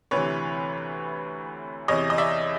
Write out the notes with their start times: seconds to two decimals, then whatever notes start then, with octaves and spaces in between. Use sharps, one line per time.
0.11 D2 C3 E3 B4 C#5
1.88 E2 C3 E3 C#5 D#5
2.10 D#5
2.18 D5 E5